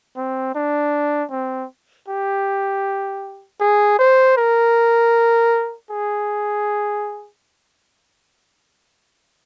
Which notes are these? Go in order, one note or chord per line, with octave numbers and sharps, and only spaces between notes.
C4
D4
C4
G4
G#4
C5
A#4
G#4